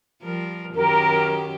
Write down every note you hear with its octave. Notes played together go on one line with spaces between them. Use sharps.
F3 G3 A#4
F#2 D#3 G4 A#4